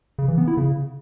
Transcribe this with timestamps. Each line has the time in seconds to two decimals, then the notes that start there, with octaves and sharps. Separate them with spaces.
0.19 C#3
0.28 E3
0.38 B3
0.48 E4
0.57 C#3